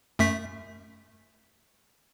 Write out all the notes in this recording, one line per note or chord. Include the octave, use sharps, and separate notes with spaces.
F#2 A3 B6